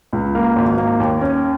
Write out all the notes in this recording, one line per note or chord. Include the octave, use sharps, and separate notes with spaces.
C#2
A#3
G#1
A#3
D#2
C#4